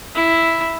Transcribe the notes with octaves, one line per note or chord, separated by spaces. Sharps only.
E4